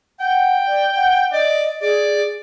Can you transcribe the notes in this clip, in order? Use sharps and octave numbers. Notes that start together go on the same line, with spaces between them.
F#5 G5
D5
F#5
D5 D#5
G#4 D5